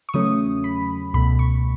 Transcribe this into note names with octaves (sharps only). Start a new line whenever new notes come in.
C#6
E2 C#3 F#3 A3 C#4 D#6
B5
C#2 B2 A3 B5
C#6